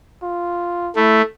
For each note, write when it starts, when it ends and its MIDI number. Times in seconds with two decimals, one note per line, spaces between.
0.23 0.91 65
0.96 1.22 57
0.96 1.21 64